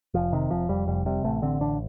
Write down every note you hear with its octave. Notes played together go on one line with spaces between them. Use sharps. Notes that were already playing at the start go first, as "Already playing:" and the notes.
F1 F3
C3 D#3
F1 F3
F2 G3
F1 G3
C3 G3
A1 A3
D3 C4
A1 D4